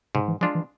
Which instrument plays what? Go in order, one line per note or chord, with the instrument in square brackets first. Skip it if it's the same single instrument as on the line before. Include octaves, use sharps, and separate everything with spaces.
[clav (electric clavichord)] G#2 [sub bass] C3
[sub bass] E3
[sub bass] F3 [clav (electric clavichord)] G#3 D4 F4
[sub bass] E3